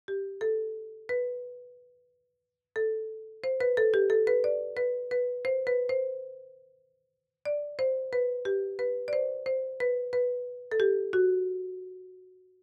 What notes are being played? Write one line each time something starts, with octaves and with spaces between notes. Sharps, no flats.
G4
A4
B4
A4
C5
B4
A4
G4
A4
B4
D5
B4
B4
C5
B4
C5
D5
C5
B4
G4
B4
D5
C5
C5
B4
B4
A4
G4
F#4